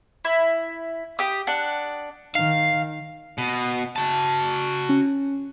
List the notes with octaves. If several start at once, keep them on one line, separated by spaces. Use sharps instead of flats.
E4
G4 D#6
D4 F#5
D#3 F5
B2
F#4 A5
C#4